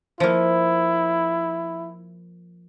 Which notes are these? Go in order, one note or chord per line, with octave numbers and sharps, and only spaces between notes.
F3 A#3 E4